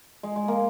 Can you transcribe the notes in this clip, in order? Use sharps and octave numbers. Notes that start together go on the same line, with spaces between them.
G#3
G#3
A#3